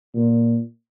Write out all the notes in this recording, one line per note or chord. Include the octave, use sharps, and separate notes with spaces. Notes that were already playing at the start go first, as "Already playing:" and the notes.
A#2